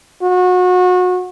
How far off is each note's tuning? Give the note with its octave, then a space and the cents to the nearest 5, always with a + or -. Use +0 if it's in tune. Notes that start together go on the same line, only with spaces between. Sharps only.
F#4 -30